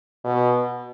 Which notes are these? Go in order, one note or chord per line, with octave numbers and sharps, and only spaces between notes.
B2